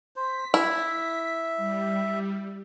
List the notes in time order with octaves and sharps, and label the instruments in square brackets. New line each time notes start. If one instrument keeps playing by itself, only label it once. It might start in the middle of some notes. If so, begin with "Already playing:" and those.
[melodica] C5 [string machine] B6
[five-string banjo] E4 [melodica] E5
[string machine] G3